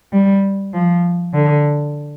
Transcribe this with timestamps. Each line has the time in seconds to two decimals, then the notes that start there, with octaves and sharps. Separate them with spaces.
0.13 G3
0.74 F3
1.34 D3